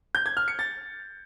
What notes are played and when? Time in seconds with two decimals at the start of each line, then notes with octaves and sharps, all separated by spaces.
0.15 G6
0.26 G#6
0.37 F6
0.48 C#7
0.59 A6